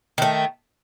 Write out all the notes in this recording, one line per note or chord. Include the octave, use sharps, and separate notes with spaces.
D#3 A3